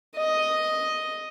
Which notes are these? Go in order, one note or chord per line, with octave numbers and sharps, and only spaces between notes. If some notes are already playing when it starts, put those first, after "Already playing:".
D#5